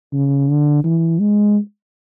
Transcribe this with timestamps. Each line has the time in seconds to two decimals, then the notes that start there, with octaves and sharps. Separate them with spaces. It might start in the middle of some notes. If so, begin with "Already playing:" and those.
0.13 C#3
0.49 D3
0.84 E3
1.20 G#3